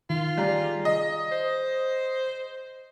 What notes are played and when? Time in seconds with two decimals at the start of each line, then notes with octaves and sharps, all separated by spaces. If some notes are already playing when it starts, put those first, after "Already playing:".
0.10 D#3 F4
0.38 G3 G#4 D5 A#5
0.85 D#5
1.32 C5